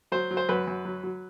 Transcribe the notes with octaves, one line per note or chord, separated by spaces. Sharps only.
F#3 C5
F#3
C5
F#2 B4
F#2
F#3
F#3